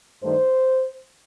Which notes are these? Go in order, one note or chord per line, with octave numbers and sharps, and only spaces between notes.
G2 D#3 A3 D4 C5